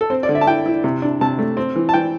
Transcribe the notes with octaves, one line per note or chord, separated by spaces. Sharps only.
A4
C4 C5
D5
D3
E5
A5
E4 G5
E4
C3
D4
C3 A5
A3
C4
E3
A5
E3 G5